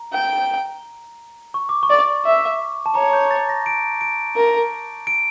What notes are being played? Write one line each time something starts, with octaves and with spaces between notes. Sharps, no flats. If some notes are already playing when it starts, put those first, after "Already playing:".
Already playing: A#5
G5
C#6
D6
C#6
D5
E5
A5
C#5 A#5
G6
A6
A#6
D7
D7
A#4
D7